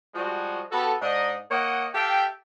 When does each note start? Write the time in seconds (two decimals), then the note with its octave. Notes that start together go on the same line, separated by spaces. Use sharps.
0.15 F3 G3 G#3 F#4
0.71 B3 F#4 G4 A4
1.02 G#2 D4 D#4 D#5
1.51 A#3 C#5 D#5 F#5
1.94 G4 A4 E5 F5 G5